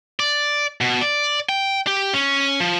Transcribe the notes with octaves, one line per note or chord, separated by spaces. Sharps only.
D5
B2
D5
G5
G4
C#4
F3